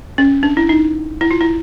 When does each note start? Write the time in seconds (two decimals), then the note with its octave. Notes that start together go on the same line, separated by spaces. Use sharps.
0.18 C#4
0.43 D4
0.57 E4
0.69 D#4
1.21 E4
1.31 F4
1.41 E4